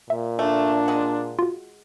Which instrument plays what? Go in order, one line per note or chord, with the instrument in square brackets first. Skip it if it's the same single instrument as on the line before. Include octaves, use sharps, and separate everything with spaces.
[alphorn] A#2 [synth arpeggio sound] E5
[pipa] A3 [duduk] D4
[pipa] G#3 F#5
[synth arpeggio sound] F4 F#4